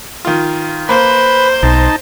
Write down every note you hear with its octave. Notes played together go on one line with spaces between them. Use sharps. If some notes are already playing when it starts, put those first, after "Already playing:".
D#3 F4
A#3 B4 C5
B1 D#4 A5